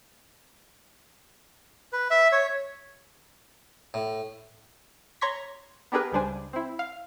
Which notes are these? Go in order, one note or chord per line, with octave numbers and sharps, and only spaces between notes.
B4
E5
C#5
A2
C#5 A#5 C6 C#6 G#6 B6
B3 D4 G4 G#4 A#4 B4
C#2 C#3 G3 D4 C5 G#5
C4 E4
F5